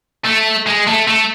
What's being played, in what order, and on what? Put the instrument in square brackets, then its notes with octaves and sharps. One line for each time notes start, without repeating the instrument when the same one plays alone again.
[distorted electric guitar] A3
G#3
A3
A3